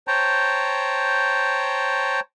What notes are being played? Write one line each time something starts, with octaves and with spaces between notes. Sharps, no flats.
C5 C#5 G5 A5 A#5